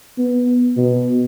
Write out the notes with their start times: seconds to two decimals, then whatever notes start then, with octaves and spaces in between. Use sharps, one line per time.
0.18 B3
0.77 B2